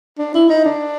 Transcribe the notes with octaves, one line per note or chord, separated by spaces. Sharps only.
D4
E4
D#4
D4